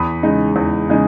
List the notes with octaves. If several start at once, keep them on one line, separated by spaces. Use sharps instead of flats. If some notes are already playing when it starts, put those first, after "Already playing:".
Already playing: E2 B5 D#6
C#3 G#3 D#4
E2
C#3 G#3 D#4